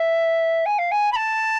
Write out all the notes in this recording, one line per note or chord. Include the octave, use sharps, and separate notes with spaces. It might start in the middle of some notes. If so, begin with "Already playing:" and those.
Already playing: E5
G#5
F5
G#5
B5
A5